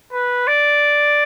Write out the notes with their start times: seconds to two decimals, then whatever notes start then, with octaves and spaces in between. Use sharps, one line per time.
0.13 B4
0.47 D5